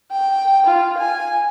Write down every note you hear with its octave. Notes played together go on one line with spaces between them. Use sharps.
G5
F4
G#5